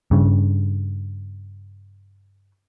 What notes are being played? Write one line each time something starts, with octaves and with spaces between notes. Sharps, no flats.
G2 C#3